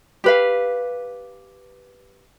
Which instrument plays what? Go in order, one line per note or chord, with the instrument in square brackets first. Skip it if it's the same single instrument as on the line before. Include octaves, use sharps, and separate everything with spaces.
[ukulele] G4 B4 F5